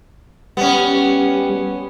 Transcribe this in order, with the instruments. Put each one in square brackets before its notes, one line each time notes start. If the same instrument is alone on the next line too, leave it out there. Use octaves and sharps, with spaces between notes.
[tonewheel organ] G3 [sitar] B3 C#4